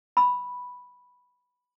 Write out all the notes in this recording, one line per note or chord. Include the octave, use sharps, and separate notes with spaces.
B5 E6